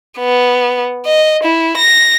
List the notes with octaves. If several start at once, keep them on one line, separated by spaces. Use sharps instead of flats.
B3
D#5
E4
A#6